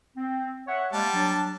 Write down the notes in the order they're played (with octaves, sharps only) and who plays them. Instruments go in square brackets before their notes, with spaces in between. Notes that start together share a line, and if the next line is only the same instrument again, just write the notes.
[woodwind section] C4
C#5 E5 F#5
[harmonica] G3 A5 [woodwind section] G#3 A#3
[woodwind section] F#3 D4